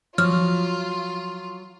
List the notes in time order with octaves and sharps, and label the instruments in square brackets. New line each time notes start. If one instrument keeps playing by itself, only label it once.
[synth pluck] F3 [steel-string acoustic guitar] F#3 [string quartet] F4 [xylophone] F6